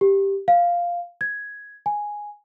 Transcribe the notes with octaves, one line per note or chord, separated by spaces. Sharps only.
G4
F5
G#6
G#5